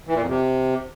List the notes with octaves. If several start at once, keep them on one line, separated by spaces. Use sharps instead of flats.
E3
A#2
F2
C3